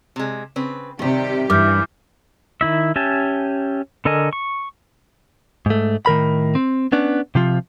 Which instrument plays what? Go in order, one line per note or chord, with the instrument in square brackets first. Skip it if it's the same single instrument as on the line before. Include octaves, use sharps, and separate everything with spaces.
[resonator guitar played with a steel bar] C3 G#3
C#3 C4 B4
[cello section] C3 G4 [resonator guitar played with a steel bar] D#3 G3
[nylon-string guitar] G2 [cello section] E3 [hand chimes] D6 F6 G6
[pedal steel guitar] D#3 E4 E5
C#4 G4 E5 G#5 A5
D3 A4 A#4 D#5 G#5
C#6
[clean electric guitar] G#2 A3
A2 D#3 A#4 B5
C4
B3 C#4 D4
C3 F3 F4